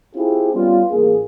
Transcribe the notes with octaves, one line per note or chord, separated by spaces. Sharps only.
C4 E4 F4 G4 G#4
G3 B3 C#4 F4
A1 A#3 G#4